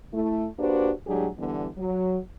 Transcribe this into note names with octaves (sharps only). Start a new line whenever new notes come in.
A3 E4
A#3 D4 F#4 G4 B4 C5
A2 F#3 G#3 D4 G4 G#4
D3 E3 G3 B3
F#3